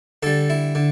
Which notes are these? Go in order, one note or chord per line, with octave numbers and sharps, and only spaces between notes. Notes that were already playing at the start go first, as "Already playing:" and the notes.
D3 G3 A4
E4
D3